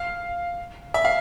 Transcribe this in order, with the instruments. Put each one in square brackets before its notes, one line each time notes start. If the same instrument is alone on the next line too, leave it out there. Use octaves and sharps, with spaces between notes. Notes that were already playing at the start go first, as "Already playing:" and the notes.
Already playing: [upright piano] F5
E5
F5